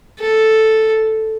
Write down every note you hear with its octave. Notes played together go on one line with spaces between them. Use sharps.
A4